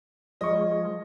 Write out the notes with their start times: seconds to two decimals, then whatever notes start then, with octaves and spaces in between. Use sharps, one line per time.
0.41 F3 G#3 D#5 C#6